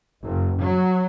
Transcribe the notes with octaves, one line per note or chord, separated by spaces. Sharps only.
F#1
F#3